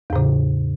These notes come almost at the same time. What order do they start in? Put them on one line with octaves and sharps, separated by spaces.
E2 A2 C#3